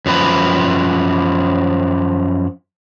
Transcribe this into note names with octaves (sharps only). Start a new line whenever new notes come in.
F#2 F3 B4